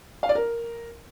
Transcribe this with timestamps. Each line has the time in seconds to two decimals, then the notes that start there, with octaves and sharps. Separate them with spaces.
0.23 F5
0.29 D5
0.35 A#4